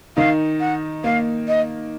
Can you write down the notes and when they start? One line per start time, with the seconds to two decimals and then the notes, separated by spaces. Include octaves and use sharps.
0.17 D#3 D#4 F5
0.60 F#5
1.04 A#3 F5
1.48 D#5